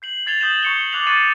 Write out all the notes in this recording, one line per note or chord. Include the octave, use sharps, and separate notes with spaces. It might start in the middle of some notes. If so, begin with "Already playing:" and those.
G6 C7 F#7
G#6 A6 C7 F7 G7
D#6 G6 A#6 E7 F#7
C#6 C#7 G7
D6 F#6 A6 C7 F7
C#6 F#6 A6 C7 D#7 E7